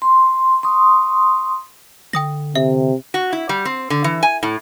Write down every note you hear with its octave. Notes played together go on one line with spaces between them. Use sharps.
C6
C6 C#6 D#6
D3 G5 D#6 A#6
C3 E5
F#4
E4
G3
C4
D3
E3
G#5
A2